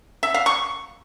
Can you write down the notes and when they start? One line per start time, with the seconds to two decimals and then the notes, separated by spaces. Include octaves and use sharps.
0.23 E5
0.34 F5
0.46 C#6